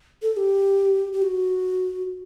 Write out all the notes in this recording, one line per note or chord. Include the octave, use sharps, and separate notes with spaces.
A4
A4
G4
G4
F#4